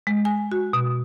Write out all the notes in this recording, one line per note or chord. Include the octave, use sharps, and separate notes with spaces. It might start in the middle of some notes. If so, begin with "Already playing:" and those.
G#3
G#5
F#4
B2